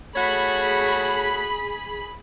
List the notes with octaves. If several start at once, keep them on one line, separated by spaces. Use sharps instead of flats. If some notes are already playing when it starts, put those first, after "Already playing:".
A3 F#4 G#4 C#5 B5